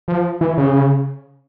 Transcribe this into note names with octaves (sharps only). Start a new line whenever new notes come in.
F3
E3
C#3